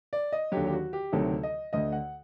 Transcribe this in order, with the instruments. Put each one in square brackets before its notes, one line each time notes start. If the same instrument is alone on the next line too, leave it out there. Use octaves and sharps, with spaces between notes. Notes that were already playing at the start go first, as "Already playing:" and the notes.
[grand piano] D5
D#5
D#2 D3 F#3 G4
G4
F#4
G4
D2 C3 D#3 F#3 A4
D#5
D2 D3 A3 D#5
F#5